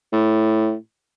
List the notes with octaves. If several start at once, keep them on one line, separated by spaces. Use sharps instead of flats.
A2